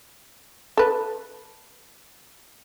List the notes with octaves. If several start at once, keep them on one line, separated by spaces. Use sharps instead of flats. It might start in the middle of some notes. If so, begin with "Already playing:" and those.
A4 B4